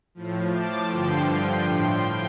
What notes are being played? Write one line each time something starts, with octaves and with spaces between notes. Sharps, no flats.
A2 F3
A5 D6
G2 D3 F3 G5 C6
G5 C6
A2 F3